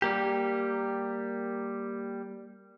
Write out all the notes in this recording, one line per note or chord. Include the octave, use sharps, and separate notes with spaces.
G3 A#3 G4